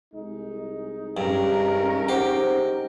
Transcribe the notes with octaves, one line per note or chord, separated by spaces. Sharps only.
C2 G#3 D#4
G2 C#4 A#4
G4 C5 F#5